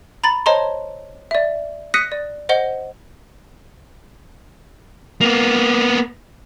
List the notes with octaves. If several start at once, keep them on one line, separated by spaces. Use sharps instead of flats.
A#5 B5 A6 F#7
C5 C#5 D#5 A5 A#5 C6
D5 E5
D#6 F#6 A#6 B6 C#7 D#7
D5
C5 D#5 F#5 G7
A#3 B3